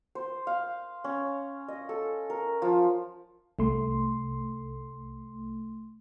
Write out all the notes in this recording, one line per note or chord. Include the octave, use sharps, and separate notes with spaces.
C5
F5
C#4
D#5
A4
A#4
F3
C2 A3 C6